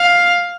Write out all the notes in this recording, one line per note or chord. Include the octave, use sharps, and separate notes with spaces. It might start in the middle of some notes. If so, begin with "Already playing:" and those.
Already playing: F5